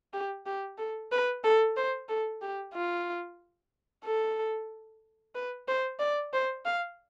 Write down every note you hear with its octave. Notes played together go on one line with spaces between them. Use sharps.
G4
G4
A4
B4
A4
C5
A4
G4
F4
A4
B4
C5
D5
C5
F5